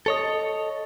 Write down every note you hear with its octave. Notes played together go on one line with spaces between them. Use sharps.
A4 C#5 D#5